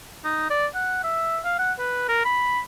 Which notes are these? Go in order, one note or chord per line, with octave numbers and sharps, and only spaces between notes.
D#4
D5
F#5
E5
F5
F#5
B4
A#4
B5